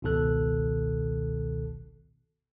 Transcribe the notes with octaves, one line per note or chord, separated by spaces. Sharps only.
G#1 C#2 B2 D#3 A4 F#6